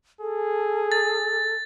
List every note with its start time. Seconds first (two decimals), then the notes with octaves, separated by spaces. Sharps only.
0.21 G#4 A4
0.92 A6